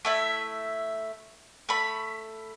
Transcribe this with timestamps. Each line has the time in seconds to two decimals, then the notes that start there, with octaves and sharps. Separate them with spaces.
0.05 A3 E4 E5
1.69 A3 B5